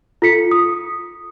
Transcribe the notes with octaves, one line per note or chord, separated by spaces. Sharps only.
F4 A4 B6 C#7
D#6